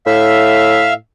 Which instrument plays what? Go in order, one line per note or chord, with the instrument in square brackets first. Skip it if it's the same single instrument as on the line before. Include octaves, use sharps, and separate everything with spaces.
[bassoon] A2 [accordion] E5 F5